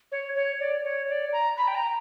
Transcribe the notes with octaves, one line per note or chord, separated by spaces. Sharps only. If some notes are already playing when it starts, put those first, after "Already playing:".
C#5
C#5
D5
C#5
D5
A#5
B5
G5
A#5